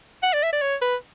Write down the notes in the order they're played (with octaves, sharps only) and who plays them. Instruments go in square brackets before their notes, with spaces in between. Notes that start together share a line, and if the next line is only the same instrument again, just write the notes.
[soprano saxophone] F#5
D5
E5
D5
C#5
B4